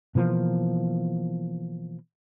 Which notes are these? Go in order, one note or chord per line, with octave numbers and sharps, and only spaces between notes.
B2 E3 F3 A#3